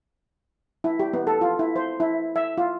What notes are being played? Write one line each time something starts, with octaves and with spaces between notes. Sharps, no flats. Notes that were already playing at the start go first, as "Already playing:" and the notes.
E4
G4
B3
A4
F4
E4
C5
E4
E5
F4